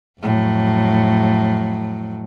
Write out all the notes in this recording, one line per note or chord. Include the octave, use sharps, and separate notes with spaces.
F2 A2 F#3